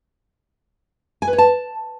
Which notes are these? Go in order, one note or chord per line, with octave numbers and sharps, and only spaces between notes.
G#5
B4
C#5
A5